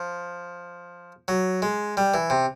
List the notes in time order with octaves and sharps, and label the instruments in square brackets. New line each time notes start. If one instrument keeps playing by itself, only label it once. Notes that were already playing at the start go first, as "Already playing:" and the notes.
Already playing: [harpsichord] F3
F#3
G#3
G3
E3
C3